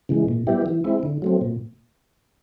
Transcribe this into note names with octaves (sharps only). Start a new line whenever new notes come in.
C#3 E3 G#3
A#2
G3 B3 E4 G4
E3
G#3 C4 E4
D3
F#3 A3 C4
A#2